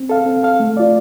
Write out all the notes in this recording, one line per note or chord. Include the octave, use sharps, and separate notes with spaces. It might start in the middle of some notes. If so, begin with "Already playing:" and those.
Already playing: C4
A4 F5
C4
A4 F5
A3
F4 D5